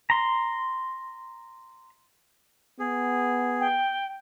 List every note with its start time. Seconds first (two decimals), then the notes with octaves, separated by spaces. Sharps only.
0.10 A#5 C6
2.79 B3 G#4
3.60 G5